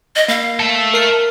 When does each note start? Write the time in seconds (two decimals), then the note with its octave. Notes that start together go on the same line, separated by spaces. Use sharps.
0.16 D#5
0.28 A#3 F5
0.60 A4 E5
0.94 A#4 C7